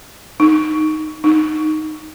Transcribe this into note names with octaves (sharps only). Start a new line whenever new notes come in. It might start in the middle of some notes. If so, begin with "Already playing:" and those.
D#4
D#4